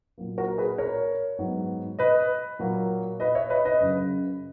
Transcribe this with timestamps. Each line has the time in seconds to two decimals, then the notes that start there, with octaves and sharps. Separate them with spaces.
0.18 A#2 F#3 A#3
0.38 F#4 A#4
0.58 G#4 B4
0.78 A#4 C#5
1.39 G#2 F#3 B3
1.99 B4 D#5
2.59 A#2 F#3 A#3
3.20 B4 D#5
3.35 C#5 E5
3.50 B4 D#5
3.65 B4 D#5
3.80 F#2 C#3 F#3